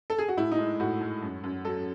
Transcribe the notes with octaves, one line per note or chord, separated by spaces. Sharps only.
A4
G#4
F#4
A2 E4
D#4
G#3
A2 F#4
G#3
F#2
F#2
F#3 A4